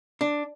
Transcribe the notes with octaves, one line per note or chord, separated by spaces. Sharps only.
D4